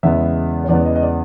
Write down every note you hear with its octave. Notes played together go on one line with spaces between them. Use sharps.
E2 C#3 E3 G#3 B3 E5
C#5
E2 C#3 E3 G#3 B3 D5
D#5
D#5
D5